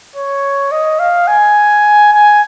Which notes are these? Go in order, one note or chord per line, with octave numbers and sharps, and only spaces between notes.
C#5
D#5
F5
G#5
G#5